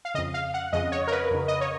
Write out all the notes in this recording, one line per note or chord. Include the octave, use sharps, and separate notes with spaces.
F5
F2 C#3 D#5
F5
F#5
F2 C#3 D#5
C#5
A#4
B4
F2 C#3
D#5
C#5